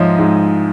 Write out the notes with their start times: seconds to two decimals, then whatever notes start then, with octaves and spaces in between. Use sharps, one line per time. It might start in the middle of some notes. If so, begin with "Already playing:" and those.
Already playing: G#2 F3 C#5 D#5 E5
0.18 G#2